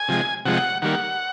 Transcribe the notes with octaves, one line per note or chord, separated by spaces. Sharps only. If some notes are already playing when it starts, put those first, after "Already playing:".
Already playing: G#5
C3 F3 G#3
C3 F3 G#3 F#5
D#3 G3 A#3 F#5